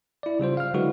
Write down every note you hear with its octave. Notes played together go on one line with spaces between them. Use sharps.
E4 D5
C#3 G3 F4 C5
F5 F6
D3 F#3 G#3 E4 F#4 B4